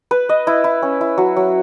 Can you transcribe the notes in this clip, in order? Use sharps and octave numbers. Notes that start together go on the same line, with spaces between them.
B4
D#5
E4
E4
C#4
E4
F#3
F#3